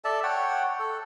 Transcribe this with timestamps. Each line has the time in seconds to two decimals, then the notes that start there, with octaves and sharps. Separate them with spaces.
0.05 A4 D5 E5 A5
0.23 C#5 F#5 G5
0.80 A4